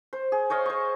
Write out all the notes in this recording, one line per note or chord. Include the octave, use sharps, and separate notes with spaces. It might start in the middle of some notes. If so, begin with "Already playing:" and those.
C5
G#4
C5 C#5 D#5 F5
C5 C#6